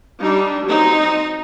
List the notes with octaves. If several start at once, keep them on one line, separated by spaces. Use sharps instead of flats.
G3 D4 D#4
F#3 C4 D#4